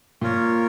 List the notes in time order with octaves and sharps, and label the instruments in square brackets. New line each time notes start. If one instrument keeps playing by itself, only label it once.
[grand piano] A#2 [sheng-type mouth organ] A#3 F4 A#4 C#5